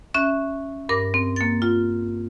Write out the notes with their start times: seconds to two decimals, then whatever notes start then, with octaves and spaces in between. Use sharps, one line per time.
0.14 C#4 E5 F#6
0.89 G2 A#4 D6
1.14 C4
1.36 A#3 A6
1.62 F4